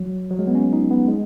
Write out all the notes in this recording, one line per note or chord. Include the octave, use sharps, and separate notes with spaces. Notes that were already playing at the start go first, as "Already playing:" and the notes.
Already playing: F#3
F#3
G#3
B3
C#4
D#4
B3
G#3